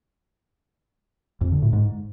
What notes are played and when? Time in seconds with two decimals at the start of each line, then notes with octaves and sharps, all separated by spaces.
1.41 F2
1.52 D3
1.62 A2
1.73 G#2